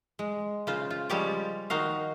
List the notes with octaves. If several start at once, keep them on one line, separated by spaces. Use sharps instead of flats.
G#3
C#3 F4 C5
F4
F3 G3 G#3 G4 C#5 D5
D#3 D#4 F#4 F5